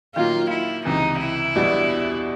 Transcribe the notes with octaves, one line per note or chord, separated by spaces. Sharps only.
D#3 F#3 A#3 F4
E4
C#2 C3 E3 D#4
E4
E2 B2 G3 B3 D4